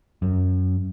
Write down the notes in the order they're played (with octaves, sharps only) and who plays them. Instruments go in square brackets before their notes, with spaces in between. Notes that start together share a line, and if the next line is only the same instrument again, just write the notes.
[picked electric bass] F#2